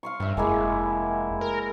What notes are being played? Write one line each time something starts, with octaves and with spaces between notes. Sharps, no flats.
F5 C6 C#6
G2 E5 G5
F1 G#3 A#3 E4
A#4